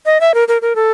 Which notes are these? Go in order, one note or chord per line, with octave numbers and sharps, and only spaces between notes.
D#5
E5
A#4
A#4
A#4
A4